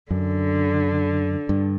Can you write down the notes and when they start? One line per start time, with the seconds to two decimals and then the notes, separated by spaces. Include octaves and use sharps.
0.11 F#2 D3
1.49 G2